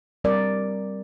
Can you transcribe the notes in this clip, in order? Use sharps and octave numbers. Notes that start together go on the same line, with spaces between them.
G3 C4 A#4 D5